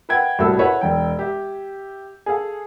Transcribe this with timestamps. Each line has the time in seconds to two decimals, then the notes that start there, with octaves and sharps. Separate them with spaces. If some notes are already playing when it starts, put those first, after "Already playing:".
0.09 B4 E5 F#5 G5 G#6
0.39 C2 A2 F#4 A4 E6
0.59 E4 A4 B4 C#5 E5 F#5
0.81 E1 G5
1.19 G4 E5
2.26 G#4 A4 F5